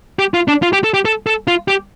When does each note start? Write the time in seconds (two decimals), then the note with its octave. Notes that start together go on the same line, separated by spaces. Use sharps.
0.19 G4
0.34 F4
0.48 D4
0.62 F4
0.73 G4
0.84 A4
0.94 G4
1.05 A4
1.27 A4
1.48 F4
1.68 G4